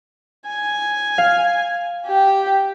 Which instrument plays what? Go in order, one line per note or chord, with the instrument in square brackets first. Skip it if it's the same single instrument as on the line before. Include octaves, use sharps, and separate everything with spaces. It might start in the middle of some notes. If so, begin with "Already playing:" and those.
[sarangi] G#5
[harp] F5
[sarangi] G4